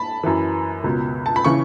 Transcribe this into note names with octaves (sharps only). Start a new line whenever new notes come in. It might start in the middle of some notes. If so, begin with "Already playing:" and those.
Already playing: A5 B5
F#2 E3
C#2 B2
A5
B5
C#3 E3 C#6